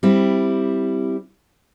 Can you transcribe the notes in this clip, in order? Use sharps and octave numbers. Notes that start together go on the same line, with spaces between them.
G3 C4 E4